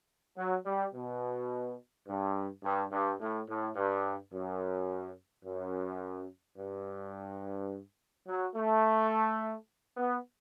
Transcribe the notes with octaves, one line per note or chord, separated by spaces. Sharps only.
F#3
G3
B2
G2
G2
G2
A2
A2
G2
F#2
F#2
G2
F#3
A3
B3